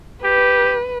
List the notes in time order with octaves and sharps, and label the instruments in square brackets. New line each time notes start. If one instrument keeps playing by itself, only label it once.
[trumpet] G4 [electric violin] B4